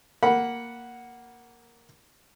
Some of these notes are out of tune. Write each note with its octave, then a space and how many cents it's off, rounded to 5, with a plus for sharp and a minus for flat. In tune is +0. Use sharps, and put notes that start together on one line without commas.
A#3 +0 F#5 +0 B5 -15